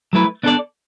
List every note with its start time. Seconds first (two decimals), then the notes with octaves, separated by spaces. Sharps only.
0.13 F#3 A3 E4 B4
0.43 B3 D4 A4 D5